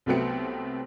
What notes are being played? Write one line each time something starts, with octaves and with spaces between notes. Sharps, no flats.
C2 F#3 A3 B3 C4 C#7